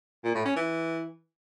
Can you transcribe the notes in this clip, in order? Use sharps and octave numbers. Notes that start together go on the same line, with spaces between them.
A#2
A2
C#4
E3